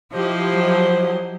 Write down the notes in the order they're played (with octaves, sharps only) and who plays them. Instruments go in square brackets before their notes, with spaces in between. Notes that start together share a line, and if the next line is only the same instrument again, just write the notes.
[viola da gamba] F3 [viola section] E4 G4 D#5 [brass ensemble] C5
[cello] F#3